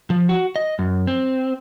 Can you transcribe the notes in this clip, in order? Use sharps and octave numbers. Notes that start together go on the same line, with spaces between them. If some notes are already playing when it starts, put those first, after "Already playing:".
F3
F#4
D#5
F#2
C4